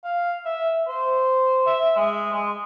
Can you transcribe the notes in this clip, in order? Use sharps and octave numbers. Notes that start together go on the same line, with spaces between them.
F5
E5
C5
E5
G#3
G#3